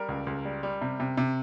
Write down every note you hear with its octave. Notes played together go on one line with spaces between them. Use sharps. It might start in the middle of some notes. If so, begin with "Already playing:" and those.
Already playing: G3 A#4
C#2
C#2
G3
G3
C3
C3
C3